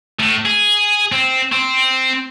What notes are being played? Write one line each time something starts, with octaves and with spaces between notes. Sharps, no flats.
A2
G#4
C4
C4